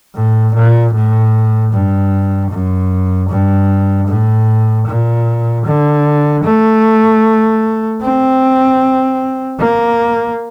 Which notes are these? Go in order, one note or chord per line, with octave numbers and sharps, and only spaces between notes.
A2
A#2
A2
G2
F#2
G2
A2
A#2
D3
A3
C4
A#3